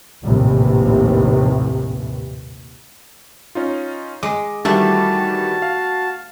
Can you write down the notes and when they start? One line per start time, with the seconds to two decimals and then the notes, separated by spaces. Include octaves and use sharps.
0.24 A#1 D#2 A2 C3 E3
3.55 C#4 D#4 F4
4.23 G#3 D#5 D6
4.65 D#3 E3 G3 A3 D4 F#4 D5 A5
5.62 F5